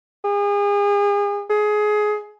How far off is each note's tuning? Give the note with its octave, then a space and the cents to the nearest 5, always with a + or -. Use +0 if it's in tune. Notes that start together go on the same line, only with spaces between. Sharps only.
G#4 -35
G#4 +20